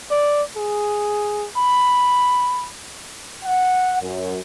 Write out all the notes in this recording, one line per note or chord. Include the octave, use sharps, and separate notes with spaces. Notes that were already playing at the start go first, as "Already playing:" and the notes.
D5
G#4
B5
F#5
F#2